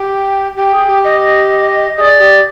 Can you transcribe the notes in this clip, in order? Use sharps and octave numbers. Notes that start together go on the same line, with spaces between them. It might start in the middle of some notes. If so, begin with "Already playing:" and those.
Already playing: G4 G5
G4 G5
G#4
G4
D#5
G#4 D5 D#5
G4